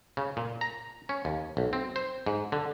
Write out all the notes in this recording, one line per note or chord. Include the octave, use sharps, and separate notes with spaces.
C#3
A#2
A#5
C#4
D#2
B1
C4
C5
G#2
D3